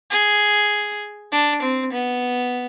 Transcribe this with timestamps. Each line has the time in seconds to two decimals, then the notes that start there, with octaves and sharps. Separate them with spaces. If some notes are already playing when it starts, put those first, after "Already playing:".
0.10 G#4
1.32 D4
1.62 C4
1.92 B3